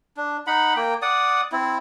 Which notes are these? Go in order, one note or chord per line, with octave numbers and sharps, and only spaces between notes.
D4
D#4 F#5 B5
A#3 G5
D5 F#5 D#6
C4 E4